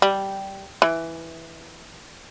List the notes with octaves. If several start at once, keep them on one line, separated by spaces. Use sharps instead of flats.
G3
E3